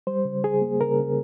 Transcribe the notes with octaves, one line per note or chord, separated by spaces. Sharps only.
G3 C5
C#3
C#3 G#4
A#3
C#3 A#4
C#3